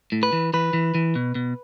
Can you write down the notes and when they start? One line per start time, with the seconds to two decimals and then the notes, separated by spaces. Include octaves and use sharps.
0.12 A2
0.23 B4
0.33 E3
0.53 E3 B4
0.73 E3
0.95 E3
1.15 B2
1.35 B2